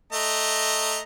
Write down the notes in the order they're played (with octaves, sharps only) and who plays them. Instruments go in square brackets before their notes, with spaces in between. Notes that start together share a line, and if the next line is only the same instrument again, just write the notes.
[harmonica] A3 D#5 A#5